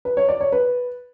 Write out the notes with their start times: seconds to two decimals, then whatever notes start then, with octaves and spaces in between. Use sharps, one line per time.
0.05 B4
0.17 C#5
0.29 D5
0.41 C#5
0.52 B4